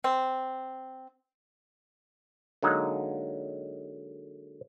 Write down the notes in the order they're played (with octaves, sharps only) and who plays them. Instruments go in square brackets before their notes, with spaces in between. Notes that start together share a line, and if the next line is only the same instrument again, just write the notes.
[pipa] C4
[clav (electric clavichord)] D3 F#3 G#3 A#3 D#4